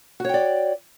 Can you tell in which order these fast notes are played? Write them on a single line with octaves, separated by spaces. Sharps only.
F#4 C#5 G5 D5